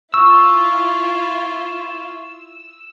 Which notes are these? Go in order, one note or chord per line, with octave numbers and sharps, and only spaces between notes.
E4 F4 C#6 E6